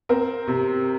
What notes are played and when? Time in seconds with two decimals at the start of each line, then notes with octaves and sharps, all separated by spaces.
0.09 C4 A#4
0.48 C3